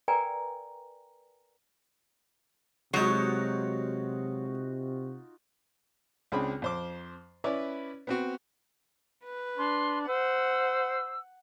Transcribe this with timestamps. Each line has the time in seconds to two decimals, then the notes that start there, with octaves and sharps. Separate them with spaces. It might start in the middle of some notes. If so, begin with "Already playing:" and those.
0.08 A#4 B4 D5 G5 G#5 A#5
2.94 C3 F#3 G#3 D#4 F4 F#4 C#5
6.32 C#2 C4 D4 G#4 B5
6.62 F2 C5 D6
7.44 C#4 E4 B4 C#5 D5
8.07 B3 C4 F#4
9.25 B4
9.58 D4 C6
10.08 C5 F#5 E6